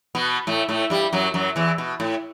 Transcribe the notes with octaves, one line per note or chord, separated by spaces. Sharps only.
B2 B3
A2 A3
A2 A3
G2 G3
F#2 F#3
F#2 F#3
E2 E3
B2
A2